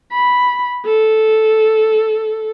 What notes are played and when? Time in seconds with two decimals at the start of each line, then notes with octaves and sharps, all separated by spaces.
0.12 B5
0.86 A4